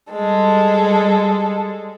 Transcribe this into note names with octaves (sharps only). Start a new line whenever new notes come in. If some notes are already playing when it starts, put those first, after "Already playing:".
G3 G#3 A4